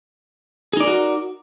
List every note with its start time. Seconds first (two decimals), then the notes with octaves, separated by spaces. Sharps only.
0.73 G#4
0.77 D#4
0.80 D5
0.84 A#4
0.87 F#4